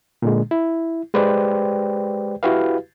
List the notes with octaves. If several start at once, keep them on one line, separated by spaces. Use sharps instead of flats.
A#2 D3 G#3
E4
G#3 G4 B4 C5 D5 G5
E4 F#4 G4 B4 F5